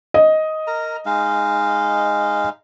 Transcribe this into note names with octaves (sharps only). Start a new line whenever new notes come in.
D#5
A#4 A#5
G#3 D#4 F5